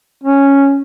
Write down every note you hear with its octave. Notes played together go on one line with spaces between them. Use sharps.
C#4